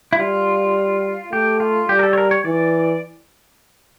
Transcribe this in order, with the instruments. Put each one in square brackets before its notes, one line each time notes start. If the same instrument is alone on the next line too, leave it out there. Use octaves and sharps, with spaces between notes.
[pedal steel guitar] E4
[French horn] G3 [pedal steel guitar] F4
[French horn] A3 [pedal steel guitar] G4
[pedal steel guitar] F4
[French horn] G3 [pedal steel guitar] G4
[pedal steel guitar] A#4
A4
C#5
A#4
C#5
[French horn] E3 [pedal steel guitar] D5